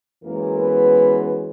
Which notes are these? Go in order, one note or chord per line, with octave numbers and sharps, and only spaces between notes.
F#2 E3 G#3 A#3 A#4
B3 B4